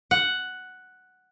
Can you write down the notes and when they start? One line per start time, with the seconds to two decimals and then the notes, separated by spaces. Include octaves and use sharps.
0.11 F#5